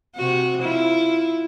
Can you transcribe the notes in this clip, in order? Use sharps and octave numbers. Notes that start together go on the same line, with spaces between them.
C3 F#4
E4 F4